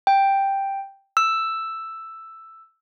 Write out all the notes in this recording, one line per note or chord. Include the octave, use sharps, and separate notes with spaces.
G5
E6